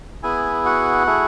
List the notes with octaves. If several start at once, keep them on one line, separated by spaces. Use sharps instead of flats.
B3 E4 G#4 G#5
F#4 F#5
A3 E4 G#4